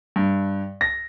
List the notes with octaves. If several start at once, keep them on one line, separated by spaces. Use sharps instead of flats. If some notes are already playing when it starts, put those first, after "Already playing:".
G2
A#6